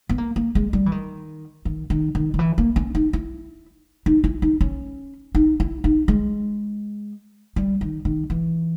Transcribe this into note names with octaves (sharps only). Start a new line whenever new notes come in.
B3
A#3
A#3
G#3
G3
E3
D#3
D#3
D#3
D#3
D#3
E3
A#3
C#4
D#4
E4
D#4
E4
D#4
C#4
D#4
E4
D#4
G#3
G3
D#3
D#3
E3